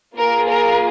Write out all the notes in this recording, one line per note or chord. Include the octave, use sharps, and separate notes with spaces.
A#3 F4 G#4 A#4
A#4